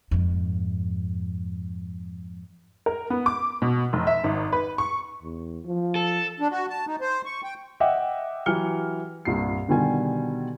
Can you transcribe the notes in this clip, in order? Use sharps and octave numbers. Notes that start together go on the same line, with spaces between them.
F2 G#2
A#4
B3
D6
B2
F1
E5
G#1
B4
C#6
E2
F3
A4
D4
F#4
A5
D#4
C5
C#6
G5
D#5 E5 F#5 G5 D6
E3 F#3 G4 F6 C#7 G7
C2 G2 A#2 C7
B2 D3 D#3 G3 G#5